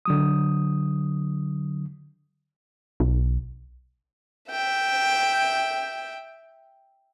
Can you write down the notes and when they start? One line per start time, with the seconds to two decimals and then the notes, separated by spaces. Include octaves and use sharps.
0.05 D3 F#3 D#6
3.00 B1
4.50 E5 G5